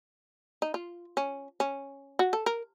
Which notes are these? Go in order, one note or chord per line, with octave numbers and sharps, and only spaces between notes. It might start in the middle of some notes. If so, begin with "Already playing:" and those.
D#4
F4
C#4
C#4
F#4
A4
A#4